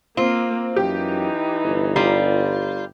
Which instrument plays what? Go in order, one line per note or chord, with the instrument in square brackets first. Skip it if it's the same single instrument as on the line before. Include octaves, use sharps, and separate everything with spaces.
[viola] A#3 [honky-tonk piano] C4 [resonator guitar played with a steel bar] F4
[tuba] F#2 [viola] E3 D#4 [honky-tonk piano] G4
[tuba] G1
[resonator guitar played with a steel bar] G3 F4 [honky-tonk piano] A#5